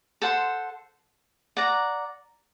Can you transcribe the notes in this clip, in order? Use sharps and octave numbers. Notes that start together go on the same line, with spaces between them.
A4 C5 F#5 C6
D5 F#5 A#5